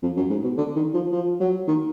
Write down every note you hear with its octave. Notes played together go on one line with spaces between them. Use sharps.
F2
F#2
G#2
B2
D3
D#3
F3
F3
F#3
D#3